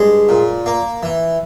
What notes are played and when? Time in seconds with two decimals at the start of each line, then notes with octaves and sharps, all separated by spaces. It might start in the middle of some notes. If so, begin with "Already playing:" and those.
Already playing: G2 G#3
0.29 A#2
0.66 A#3
1.03 E3